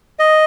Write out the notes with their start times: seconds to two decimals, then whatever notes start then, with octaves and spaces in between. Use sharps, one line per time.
0.19 D#5